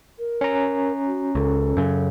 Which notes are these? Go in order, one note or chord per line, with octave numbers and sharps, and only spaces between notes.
A#4
C#4 A#5
F#4
C#2 A4
F#2 C#3